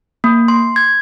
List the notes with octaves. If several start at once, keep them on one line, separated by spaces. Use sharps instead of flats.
A#3
C6
G#6